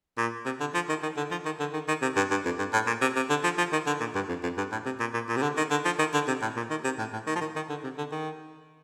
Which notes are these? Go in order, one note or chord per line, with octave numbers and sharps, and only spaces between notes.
A#2
C3
D3
F3
D#3
D#3
D3
F3
D#3
D3
D#3
D#3
C3
G2
G2
F2
G2
A2
A#2
C3
C3
D3
F3
F3
D#3
D3
A#2
G2
F2
F2
G2
A2
C3
A#2
A#2
A#2
C3
D3
D#3
D3
F3
D#3
D3
C3
A2
A#2
D#3
C3
A2
A2
D#3
F3
D#3
D#3
D3
C3
D3
D#3